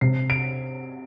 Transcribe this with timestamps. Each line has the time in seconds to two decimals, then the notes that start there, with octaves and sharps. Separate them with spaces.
0.01 C3 C7
0.30 D7